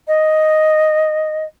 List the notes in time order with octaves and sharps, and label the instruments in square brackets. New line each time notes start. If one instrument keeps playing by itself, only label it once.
[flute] D#5